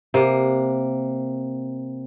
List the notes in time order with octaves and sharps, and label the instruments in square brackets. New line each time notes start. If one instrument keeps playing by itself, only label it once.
[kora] C3 A#3